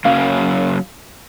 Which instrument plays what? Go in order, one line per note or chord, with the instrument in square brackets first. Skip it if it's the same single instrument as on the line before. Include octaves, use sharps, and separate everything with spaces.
[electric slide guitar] F#2 C#3 F#3 A#3 C#4 [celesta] F5